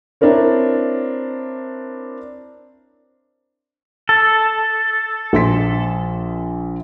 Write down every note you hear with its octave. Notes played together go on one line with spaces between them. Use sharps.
C4 D4 E4 A#4 C#5
A4
A#1 C6 B6